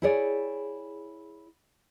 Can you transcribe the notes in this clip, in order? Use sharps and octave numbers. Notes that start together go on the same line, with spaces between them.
E4 G4 G#4 C#5 D5